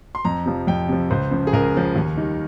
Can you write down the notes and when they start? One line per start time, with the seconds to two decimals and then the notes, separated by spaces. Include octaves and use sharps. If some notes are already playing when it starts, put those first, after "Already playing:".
0.15 C6
0.25 F2 A#5
0.46 C3 F3
0.67 F2 G5
0.89 C3 F3
1.11 C#2 C5
1.31 C#3 F3
1.47 G#4
1.53 C#2 A#4
1.75 C#3 F3
1.96 D#2
2.17 D#3 G3